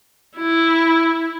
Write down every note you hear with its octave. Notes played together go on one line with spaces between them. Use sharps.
E4